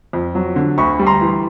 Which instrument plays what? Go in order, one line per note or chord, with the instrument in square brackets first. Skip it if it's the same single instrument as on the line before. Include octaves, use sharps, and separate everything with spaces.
[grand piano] F2
F#3
D3
D2 B5 C#6
G3
A#5 C6
E3